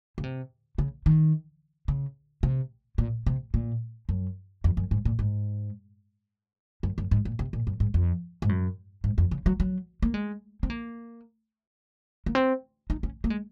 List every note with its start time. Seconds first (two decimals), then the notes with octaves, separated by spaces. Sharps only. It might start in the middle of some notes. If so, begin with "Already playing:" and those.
0.18 C#3
0.23 C3
0.78 C#3
1.06 D#3
1.88 C#3
2.43 C3
2.98 A#2
3.26 C3
3.54 A#2
4.09 F#2
4.64 F2
4.77 F#2
4.91 G#2
5.05 A#2
5.19 G#2
6.83 F#2
6.98 F#2
7.11 G#2
7.25 A#2
7.39 C3
7.53 A#2
7.67 F#2
7.80 G#2
7.94 F2
8.42 G#2
8.49 F#2
9.04 G#2
9.18 F2
9.31 C#3
9.46 F#3
9.60 F#3
10.02 A#3
10.14 G#3
10.63 C4
10.70 A#3
12.26 A#3
12.35 C4
12.90 D#4
13.03 C#4
13.24 A#3
13.30 G#3